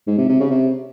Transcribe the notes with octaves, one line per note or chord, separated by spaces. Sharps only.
G#2
C3
C3
C#3
C3